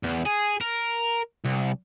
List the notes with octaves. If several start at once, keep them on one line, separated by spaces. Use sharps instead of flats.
E2
G#4
A#4
C2